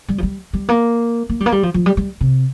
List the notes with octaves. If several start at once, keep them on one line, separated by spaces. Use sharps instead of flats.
G3
F3
G3
G3
A#3
A#3
G3
A#3
G3
F3
F3
G3
G3
C3